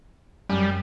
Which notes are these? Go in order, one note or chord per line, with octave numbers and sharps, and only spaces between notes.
F#2 G3